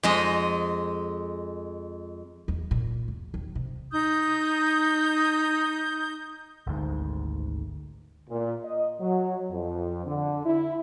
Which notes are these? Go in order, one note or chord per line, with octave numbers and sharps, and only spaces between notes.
F2 G#3 D#5
E2
A#2
E2
D#2
C3
D#4 D#6 G6
G#1 D2 G#2
A#2
D#5
F#3
F2
D3
E4